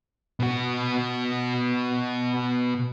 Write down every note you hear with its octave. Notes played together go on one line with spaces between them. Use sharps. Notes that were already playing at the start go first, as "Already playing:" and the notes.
B2 F#4